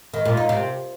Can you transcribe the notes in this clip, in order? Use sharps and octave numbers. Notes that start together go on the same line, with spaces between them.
D#3
A#2
D#4
C3